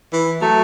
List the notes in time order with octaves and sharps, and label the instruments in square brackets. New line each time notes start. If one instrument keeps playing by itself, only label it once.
[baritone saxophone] E3
[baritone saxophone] F#3 [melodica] A3